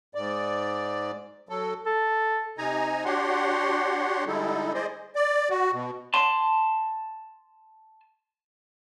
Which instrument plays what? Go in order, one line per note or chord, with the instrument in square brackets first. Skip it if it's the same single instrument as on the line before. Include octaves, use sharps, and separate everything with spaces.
[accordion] G#2 D5
F#3 A4
[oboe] A4
[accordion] C3 D#4 G#5 A#5
D4 F#4 G4 C#5 F#5 C6
D3 G3 G#3 D#4 E4 A4
G#4 C5 D5 D#5
D5
F#4
B2
[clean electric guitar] A5 C6